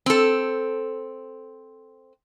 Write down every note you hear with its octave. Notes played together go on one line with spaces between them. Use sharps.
C4 A4